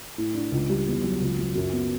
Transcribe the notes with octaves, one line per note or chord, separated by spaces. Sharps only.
A2
D4
C#2
G3
E2
F#3
C#2
F#3
F#2
B3